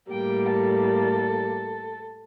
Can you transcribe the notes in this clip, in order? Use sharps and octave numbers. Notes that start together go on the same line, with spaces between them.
A2 G3 A#3 G5
A4